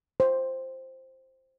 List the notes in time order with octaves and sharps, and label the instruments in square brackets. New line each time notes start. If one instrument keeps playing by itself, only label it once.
[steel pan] C5